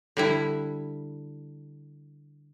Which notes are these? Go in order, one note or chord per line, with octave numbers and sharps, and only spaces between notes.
D3 G3 E4